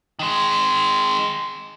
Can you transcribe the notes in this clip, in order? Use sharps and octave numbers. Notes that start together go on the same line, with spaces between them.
D#3 G#3